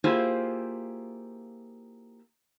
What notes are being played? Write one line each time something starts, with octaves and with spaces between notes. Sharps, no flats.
A#3 E4 F4 G4 G#4 C5